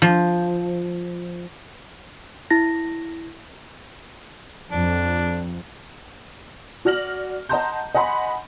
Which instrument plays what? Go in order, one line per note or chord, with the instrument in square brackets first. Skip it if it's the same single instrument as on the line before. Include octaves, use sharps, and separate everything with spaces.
[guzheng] F3
[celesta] E4 A#6
[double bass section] F2 [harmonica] D4
[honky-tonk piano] F#4 D5 F6 A#6 F#7
D#5 F#5 A5 A#5 C6 G6
D#5 F#5 G#5 B5 C6